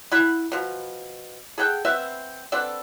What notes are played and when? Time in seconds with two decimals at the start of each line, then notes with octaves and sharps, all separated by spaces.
0.12 E4 F#5 B5
0.52 B2 F3
1.58 G#4 A4 F#5 G5
1.85 B3 C4 E5
2.52 B3 C4 D4 A4